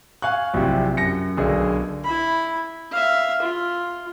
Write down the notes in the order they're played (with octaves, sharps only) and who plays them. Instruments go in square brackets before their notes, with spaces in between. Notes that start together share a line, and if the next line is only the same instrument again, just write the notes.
[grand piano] F5 G#5 C#6 F#6
A#1 C3 F#3 E4 G4
F#2 A#6 C#7
B1 D3 G#4 A#4
[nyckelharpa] E4 B5
E5 F5
F4